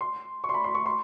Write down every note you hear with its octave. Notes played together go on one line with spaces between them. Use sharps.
C6
C#6
C6
B5
C6
C#6
C6